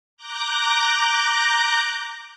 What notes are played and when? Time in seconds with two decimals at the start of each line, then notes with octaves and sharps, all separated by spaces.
0.17 A#5 D6 F#6 G6 A#6